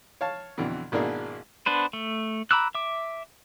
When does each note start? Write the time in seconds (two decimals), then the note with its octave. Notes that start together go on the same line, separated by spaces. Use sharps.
0.21 C#5 F5 A5
0.58 F2 B2 D3 E3
0.92 G#1 B2 A#3 D4 E4 G#4
1.66 B3 D4 B4 C5
1.93 A3
2.51 A#5 B5 D6 E6 F#6
2.75 E5 D6